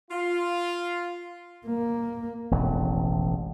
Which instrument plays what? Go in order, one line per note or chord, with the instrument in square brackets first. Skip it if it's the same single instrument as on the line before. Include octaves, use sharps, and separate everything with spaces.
[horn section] F4
[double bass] A#3
[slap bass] E1 A1 F2